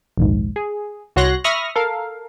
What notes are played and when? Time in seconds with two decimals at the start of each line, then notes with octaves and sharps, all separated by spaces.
0.18 A#1 D#2 G#2
0.56 G#4
1.16 C2 F#4 C#5 C6 F#6 A#6
1.44 E5 B5 C#6 D#6 F6 A#6
1.76 A4 A#4 F5